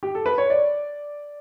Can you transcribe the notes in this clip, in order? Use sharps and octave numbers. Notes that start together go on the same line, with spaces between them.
G4
A4
B4
C#5
D5